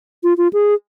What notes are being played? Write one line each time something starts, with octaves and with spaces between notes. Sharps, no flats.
F4
F4
G#4